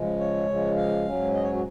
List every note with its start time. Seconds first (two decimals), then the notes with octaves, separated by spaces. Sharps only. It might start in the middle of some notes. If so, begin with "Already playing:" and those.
Already playing: C#3 F3 G#3
0.19 C#5
0.47 C#3 F3 G#3
0.76 F5
1.05 G#2 F#3 C#4
1.34 D#5
1.43 C#5
1.52 F#4